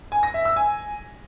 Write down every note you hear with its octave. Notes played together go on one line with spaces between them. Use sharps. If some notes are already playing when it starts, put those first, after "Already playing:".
G#5
A#6
E5
E6
G#5